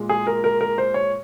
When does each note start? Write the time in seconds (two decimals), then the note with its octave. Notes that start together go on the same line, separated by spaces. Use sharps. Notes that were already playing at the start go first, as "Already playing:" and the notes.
Already playing: A#2 G#3
0.09 G#4
0.27 A#4
0.44 A#4
0.61 A#4
0.78 C5
0.94 C#5